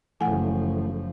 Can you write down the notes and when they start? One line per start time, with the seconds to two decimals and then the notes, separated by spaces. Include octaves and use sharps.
0.21 F#1 E3 F3 A3 F#5 G#5